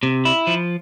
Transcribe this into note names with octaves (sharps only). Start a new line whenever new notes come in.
C3
E4
F3